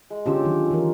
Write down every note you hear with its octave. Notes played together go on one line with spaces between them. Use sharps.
G#3
D3 F3 C#4 G4 E6
D#3 F#3 F4
E3 F4 A#4